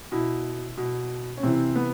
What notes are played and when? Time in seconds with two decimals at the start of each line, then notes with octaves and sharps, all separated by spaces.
0.12 B2 E4
0.77 B2
1.37 C#4
1.43 C3 E3 C4
1.76 B3